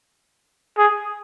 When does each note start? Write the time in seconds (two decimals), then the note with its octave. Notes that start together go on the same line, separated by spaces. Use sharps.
0.78 G#4